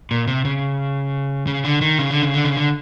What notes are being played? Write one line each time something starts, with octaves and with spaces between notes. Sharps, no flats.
A#2
C3
C#3
C#3
D3
D#3
C#3
D3
C#3
D3
C#3
D3